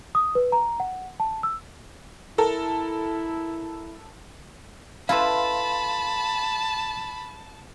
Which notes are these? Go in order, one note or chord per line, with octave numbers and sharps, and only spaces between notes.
D#6
B4
A#5
F#5
A5
E6
E4 A4 A#4
E4 A4 B4 F5 A5 B5 C6